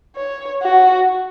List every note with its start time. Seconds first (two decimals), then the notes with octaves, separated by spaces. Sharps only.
0.16 C#5
0.62 F#4